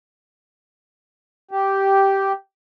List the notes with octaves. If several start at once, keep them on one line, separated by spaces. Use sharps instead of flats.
G4